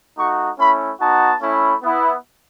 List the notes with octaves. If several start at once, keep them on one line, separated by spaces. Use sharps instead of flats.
A3 D#4 F#4 C#6
A3 C#4 E4 B5
B3 D#4 F#4 A5
A3 C#4 E4
B3 E4